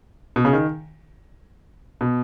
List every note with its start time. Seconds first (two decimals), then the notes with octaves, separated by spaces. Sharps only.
0.36 B2
0.45 C#3
0.53 D#3
2.01 B2